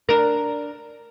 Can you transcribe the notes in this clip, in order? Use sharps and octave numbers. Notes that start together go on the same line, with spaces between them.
D4 A#4